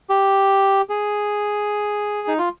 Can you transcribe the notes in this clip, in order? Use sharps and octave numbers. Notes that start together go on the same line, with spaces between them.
G4
G#4
D#4
F4